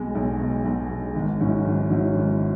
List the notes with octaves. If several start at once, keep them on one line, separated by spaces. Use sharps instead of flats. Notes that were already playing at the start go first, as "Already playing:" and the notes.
Already playing: B1 B2 G#3
B1
B2 G#3
B1
B2 G#3
G#1
G#2 F#3 C#4 E4
G#1
G#2 F#3 C#4 E4
G#1